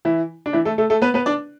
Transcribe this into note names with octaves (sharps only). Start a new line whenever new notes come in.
E3 E4
D4
E3 E4
A3 A4
A3 A4
A3 A4
B3 B4
B3 B4
D4 D5